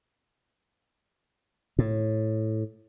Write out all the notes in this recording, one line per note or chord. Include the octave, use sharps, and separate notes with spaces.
A2